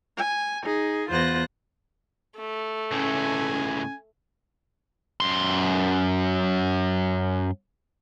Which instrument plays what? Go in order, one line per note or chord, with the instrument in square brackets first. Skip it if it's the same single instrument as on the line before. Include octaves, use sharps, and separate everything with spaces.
[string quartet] G#5
D#4 G#4
E2 B3 F4 C5 F#6 A#6
[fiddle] A3
[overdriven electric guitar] C#2 A2 [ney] C#4 [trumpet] G#5
[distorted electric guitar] F#2 C6